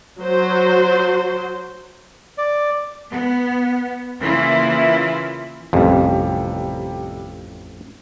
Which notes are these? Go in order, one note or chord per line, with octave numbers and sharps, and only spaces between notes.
F#3 C5
D5
B3
C#3 E3 A#3 E4 F4
A1 F2 C3 G3